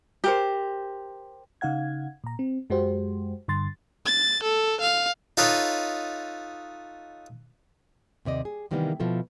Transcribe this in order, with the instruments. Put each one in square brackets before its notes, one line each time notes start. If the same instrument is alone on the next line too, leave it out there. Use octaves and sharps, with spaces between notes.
[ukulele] G4 A#4 C5
[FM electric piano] C#3 D#4 F5 F#5 G#6
A#2 A#5
C4
F#2 G#3 F#4 G4 C5
G2 D3 C6 A6
[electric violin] A6
A4
F5
[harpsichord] D#4 F4 A4 B4 C#5 D#5
[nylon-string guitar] D#2 C3 D5 D#5
G#4
C3 D#3 E3 G3 A#3 B3
B2 F3 E4 A4